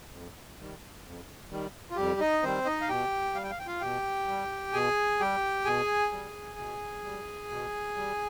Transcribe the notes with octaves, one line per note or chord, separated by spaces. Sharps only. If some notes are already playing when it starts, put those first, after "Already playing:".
F2
D#3 G3
F2
D#3 G3
F4
F2 G3 G4
D#4 D#5
D#3 G3 C4 C5
D#4 D#5
F5
B2 G4 G5
G3 F5
G5
F5
G5
F4 F5
B2 G4 G5
G3
B2 G#4 G#5
G3 G4 G5
B2 G#4 G#5
G3
B2
G3
B2
G3